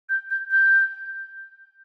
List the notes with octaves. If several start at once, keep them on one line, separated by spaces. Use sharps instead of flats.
G6
G6
G6